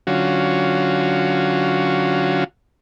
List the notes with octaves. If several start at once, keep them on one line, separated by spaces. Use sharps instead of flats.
D3 F#3 C#4 F4 F#4